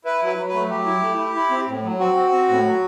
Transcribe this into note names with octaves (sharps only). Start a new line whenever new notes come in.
E4 B4
F#3
B4
F#3
B4
A3
F#3 G4
E4
A3
E4
E4
C4
A2
F#3
C4 F#4
C4
C4
A2
F#3